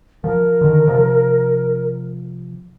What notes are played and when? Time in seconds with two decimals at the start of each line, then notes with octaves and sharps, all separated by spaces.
0.24 F3 A#4
0.61 D3 D#3
0.87 C3 F3